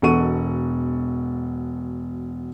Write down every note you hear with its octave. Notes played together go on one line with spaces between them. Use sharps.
E1 B2 A4 F#5 C#6 D#7